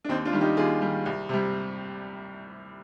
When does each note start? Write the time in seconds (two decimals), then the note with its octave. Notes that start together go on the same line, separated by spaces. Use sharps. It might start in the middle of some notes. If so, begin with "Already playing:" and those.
0.05 D4
0.09 D#2 C4 D#4
0.25 D4 F4
0.33 D#3 G3
0.41 D#4 G4
0.57 D#2 F4 G#4
0.81 D#3 G3
1.06 C2
1.29 C3 G3